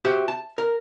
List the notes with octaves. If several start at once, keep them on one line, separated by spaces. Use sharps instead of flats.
F#4 G4 C5 E5
A5
A#4